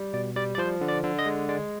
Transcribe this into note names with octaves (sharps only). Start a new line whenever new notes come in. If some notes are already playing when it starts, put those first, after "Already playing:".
Already playing: G3
B2 D5
G3 D5
D5
F3 C5
D3
D5
D3
D#5
G#3
G#3 D5